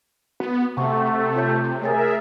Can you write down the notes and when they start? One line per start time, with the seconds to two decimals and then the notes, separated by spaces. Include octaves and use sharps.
0.40 B3 F#4
0.77 C3 A3 F#5 C#6
1.36 F4 C#5 G6
1.82 A3 G#4 A#4 C#5 E5 A6